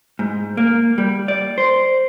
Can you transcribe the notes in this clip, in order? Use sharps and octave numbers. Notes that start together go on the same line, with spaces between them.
G#2
A#3
G3
D5
C5